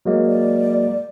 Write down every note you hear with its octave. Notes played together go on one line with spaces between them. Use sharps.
F#3 G#3 A#3
D5